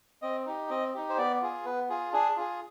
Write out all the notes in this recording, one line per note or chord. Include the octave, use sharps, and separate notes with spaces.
C4 D#5
D#4 G4
C4 D#5
D#4 G4
C5
B3 D5
F4 G#4
B3 B4
F4 G#4
D4 G#4
F4 G#4